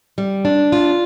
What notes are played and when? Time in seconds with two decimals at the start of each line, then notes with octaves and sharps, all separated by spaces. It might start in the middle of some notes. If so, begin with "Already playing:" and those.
0.18 G3
0.45 D4
0.72 F4